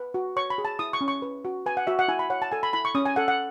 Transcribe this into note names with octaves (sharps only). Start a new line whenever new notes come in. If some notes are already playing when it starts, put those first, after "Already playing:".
Already playing: B4
F#4
C#5 C#6
B5
G#4
A5
E4 D#6
C#6
C#4
C#6
B4
F#4
B4 G#5
F#5
F#4 E5
F#5
E4 G#5
B5
C#5 F#5
A5
A4 G#5
B5
E4 B5
C#6
C#4 D#6
G#5
A4 F#5
F#5